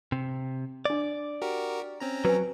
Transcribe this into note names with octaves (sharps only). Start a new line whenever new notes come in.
C3
D4 D5 D6
F#4 G4 A#4
C4 C#4 A#5
F#3 B4 G#5